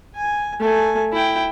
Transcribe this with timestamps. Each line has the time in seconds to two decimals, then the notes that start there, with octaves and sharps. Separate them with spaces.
0.15 G#5
0.60 A3 G#5
1.13 E4 G5